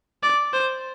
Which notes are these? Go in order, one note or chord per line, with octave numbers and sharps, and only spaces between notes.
D5
C5